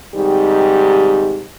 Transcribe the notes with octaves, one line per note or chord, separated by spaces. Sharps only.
G#2 C3 D#3 G3 G4